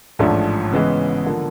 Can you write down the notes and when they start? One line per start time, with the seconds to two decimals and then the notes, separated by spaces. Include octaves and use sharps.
0.19 A1 G#2 F3 A3 D4
0.72 C#3 E3 G#3 B3
1.26 D3 F3 A#3